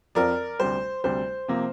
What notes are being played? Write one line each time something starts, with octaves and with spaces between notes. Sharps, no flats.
F2 F3 C4 A#4 D5
D2 C3 G3 C5
D2 C3 G3 C5
C3 F3 A#3